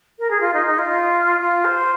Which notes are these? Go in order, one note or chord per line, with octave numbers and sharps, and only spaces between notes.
A#4
G#4
F4
D#4
D#4
F4
F4
C5